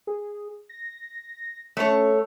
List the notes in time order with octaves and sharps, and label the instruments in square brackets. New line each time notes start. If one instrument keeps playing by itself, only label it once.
[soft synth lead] G#4
A#6
[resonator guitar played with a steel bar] A3 C#5 [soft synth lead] C#4